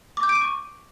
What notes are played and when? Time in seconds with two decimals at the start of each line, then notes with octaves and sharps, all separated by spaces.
0.17 D6
0.23 G6
0.29 D7
0.35 D#7
0.41 C#6